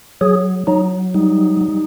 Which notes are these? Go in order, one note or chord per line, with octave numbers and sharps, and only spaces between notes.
F#3 G#4
F#3 D#4
G3 D#4
G3